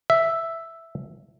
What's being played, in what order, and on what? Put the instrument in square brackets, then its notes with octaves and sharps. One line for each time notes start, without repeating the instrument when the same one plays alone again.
[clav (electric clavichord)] E5